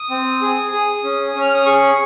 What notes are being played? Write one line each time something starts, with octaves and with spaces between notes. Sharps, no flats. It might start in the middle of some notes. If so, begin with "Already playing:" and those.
Already playing: D#6
C4
G#4
G#4
C#4
C#4
F6
D#6
G#4 C#6